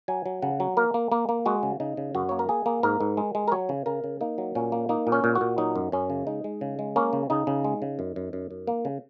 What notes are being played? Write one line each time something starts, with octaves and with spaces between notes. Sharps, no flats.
F#3 G#5
F#3
C#3 F#5
F#3
A#3 A#4
A#3
A#3
A#3
G#3 F#4
C#3
C#3 D#4
C#3
F#2 F#4
A#3 C#5
A#4
A#3 G#4
A#3
G#2 A#4
G#2
G#3
G#3
A#4
F#3 C#5
C#3
C#3 A#4
C#3
A#3 D#4
F#3
A#2 C#4
A#3
A#3 D#4
A#2
C#4
A#2
F#4
A#2
F#3 D#4
F#2
F#2 C#4
C#3
G#3 D#4
G#3
C#3
G#3
A#3 C#4
C#3
C#3 D#4
C#3
G#3
C#3
F#2
F#2
F#2
F#2
A#3
C#3